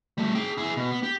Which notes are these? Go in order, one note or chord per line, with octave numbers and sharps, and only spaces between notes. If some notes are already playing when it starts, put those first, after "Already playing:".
G3 A3
G#4 G5
E4 G#4
B2
B3
G4